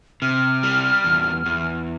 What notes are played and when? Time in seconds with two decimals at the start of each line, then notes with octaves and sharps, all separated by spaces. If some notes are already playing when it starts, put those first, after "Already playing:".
0.22 C3 F6
0.63 G3
1.04 E2
1.46 E2